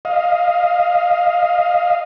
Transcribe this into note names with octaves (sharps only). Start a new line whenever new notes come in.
D#5 F5